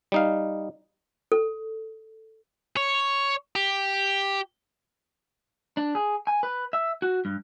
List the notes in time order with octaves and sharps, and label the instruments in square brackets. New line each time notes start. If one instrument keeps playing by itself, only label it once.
[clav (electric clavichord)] G3 D#4 F5
[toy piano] A4
[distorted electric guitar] C#5
G4
[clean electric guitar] D4
G#4
G#5
B4
E5
F#4
G2